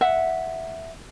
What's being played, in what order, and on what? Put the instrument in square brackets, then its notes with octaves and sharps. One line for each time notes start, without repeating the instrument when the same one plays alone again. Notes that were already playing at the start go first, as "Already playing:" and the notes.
[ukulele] E5 F#5